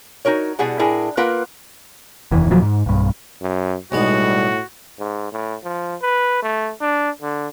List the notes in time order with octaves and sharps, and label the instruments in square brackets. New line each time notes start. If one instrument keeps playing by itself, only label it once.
[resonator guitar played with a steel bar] D#4 F#4 A#4 C#5
B2 G3 E4 G#4 F#5
A2 D4 E4 G#4 A#4
A#3 F4 A#4 B4 F#5
[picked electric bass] F1 D#2 E3
D#1 D#2 F3 F#3
G#2
B1 G2
[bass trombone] F#2
[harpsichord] B1 G#3 B3 [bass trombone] A2 [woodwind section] G3 [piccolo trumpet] F#4
[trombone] G#2
A2
F3
B4
A3
D4
D3